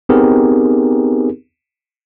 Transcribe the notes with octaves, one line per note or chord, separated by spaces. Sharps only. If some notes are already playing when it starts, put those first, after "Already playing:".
B3 C4 D#4 G4 G#4 A#4